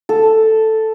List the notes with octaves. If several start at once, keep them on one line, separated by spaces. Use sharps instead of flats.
A4